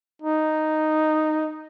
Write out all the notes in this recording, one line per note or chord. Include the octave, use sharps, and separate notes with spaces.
D#4